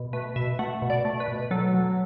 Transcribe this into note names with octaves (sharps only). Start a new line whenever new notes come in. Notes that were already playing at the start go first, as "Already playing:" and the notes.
Already playing: B2
A3 B4
B2 E5
A3 F#5
B2
D5
A3
B4
B2
F#3 A4
F#3